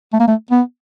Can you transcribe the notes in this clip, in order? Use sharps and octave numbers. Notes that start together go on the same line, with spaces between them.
A3
A#3
A3
B3